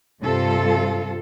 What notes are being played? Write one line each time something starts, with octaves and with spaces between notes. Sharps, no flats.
G2 C3 F4 A4